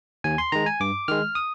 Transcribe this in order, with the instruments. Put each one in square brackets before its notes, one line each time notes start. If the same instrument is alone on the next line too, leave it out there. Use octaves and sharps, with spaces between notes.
[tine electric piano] D#2 G#5
C6
D#3 G#3 A#5
G#5
G2 D6
D#3 G#3 F6
D#6